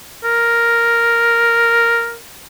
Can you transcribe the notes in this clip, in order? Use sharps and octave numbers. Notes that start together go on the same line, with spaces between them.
A#4